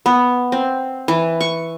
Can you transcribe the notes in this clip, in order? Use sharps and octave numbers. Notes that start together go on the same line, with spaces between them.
B3
C4
E3
C#6